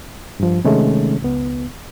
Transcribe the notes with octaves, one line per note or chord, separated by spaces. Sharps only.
G2 F3
C3 D#3 G#3 A3 C#4
C#2 B3